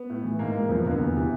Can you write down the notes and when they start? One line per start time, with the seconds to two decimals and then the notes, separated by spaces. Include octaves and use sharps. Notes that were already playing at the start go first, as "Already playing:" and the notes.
Already playing: B3
0.10 A2
0.24 E3
0.39 G#2 A#3
0.55 E3
0.69 F2 C4
0.77 B3
0.85 D3 A#3
0.91 B3
1.00 E2
1.16 C3 E3